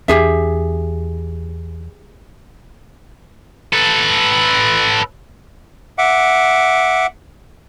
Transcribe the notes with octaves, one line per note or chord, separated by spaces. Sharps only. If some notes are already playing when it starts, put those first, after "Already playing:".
E2 D4 G4 G#4 E5
A4 B4
E5 F#5 D6